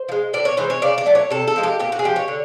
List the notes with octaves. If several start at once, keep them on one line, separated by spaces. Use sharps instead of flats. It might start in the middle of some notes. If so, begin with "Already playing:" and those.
Already playing: C5
F3
G#3
A2 D5
C#5
E3 G#3 C5
C#5
C#3 D5
D5
F#3 A3
C#5
C3 A4
A4
F3 G#3
G4
A#2 G4
F#4
G#4
F3 G#3 G4
C#5
D3